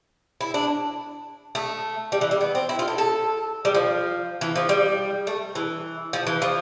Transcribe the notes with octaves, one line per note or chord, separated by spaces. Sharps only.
E4
D4
A3
G3
E3
G3
B3
C4
E4
F4
A4
A4
G3
F3
E3
F3
G3
A3
E3
F3
E3
F3